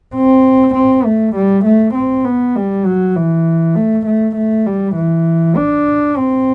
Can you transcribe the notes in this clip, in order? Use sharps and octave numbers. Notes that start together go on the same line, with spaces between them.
C4
C4
A3
G3
A3
C4
B3
G3
F#3
E3
A3
A3
A3
G3
E3
D4
C4